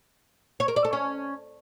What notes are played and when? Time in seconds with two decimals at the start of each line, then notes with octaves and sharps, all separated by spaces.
0.60 C#5
0.68 A#4
0.76 D5
0.85 A4
0.93 C#4